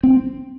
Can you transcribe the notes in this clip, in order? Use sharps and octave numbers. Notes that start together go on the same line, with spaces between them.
C4